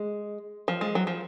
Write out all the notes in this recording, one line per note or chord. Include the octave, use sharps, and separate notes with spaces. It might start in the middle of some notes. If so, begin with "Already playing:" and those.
Already playing: G#3
F3
G#3
F#3
F3